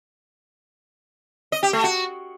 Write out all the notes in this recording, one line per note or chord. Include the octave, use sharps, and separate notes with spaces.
D#5
G4
A3
F#4